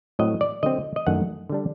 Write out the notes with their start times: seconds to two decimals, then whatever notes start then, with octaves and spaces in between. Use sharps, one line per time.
0.19 A2 F#3 C4 D#5
0.41 D5
0.63 D3 F#3 C4 D#5
0.96 D#5
1.07 F#2 D#3 A3 D4 F#5
1.49 D3 G3 D4